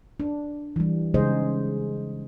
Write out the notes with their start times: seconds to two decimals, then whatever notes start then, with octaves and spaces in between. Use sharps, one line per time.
0.20 D4
0.76 E3 G3
1.14 C#3 G#3 D#4 G#4 C5 D#5